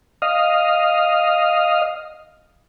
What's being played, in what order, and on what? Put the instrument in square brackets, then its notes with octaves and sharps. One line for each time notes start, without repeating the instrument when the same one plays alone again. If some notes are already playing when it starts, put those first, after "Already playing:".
[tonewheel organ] D#5 F5